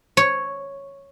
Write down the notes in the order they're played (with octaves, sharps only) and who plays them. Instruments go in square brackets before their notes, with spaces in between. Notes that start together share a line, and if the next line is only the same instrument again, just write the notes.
[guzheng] C#5